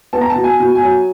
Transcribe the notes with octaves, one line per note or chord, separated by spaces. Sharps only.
B3 A5
A#5
A5
B2
G#5
B2
G#5
F#3